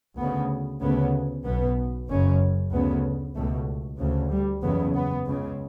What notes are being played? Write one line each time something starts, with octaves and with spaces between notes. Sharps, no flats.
D2 C#3 B3
D2 C#3 B3
B1 B2 B3
F#1 F#2 C#3 C#4
D2 C#3 B3
C#2 B2 A3
D2 C#3
G3
F#1 E2 C#3 B3
B3
C#2 C#3